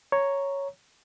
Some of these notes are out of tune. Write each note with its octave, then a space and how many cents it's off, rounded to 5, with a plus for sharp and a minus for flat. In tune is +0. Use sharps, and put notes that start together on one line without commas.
C#5 +0 A#5 +0